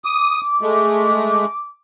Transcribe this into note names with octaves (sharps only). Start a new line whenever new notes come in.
D6 D#6
G#3 A3